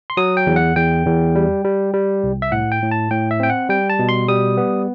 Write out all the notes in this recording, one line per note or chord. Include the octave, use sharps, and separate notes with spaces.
C6
F#3 D#6
G5
E2
F#5
E2 G5
E2
G3
G3
G3
C2
E5
A2 F#5
G5
A2
A5
A2 G5
E5
C4 G5
F#5
G3 G5
A5
B2
C6
G3 D#6
B3